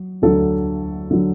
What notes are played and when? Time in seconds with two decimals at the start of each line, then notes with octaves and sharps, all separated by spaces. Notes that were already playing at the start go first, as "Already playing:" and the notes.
Already playing: F#3
0.22 D2 D3 F#3 A4
1.11 D3 F#3